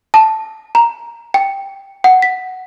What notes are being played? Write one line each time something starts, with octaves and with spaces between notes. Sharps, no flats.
A5
A#5
G5
F#5
B6